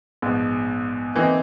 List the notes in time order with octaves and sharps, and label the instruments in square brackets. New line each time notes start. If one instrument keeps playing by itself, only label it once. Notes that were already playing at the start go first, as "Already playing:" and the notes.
[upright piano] A#1 G#2 B2
D3 E3 A#3 C4 D#4